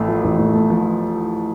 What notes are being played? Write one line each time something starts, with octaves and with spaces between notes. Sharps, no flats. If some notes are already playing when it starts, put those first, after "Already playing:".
Already playing: A1 A2 A3
F3
A1
A2
A3
F3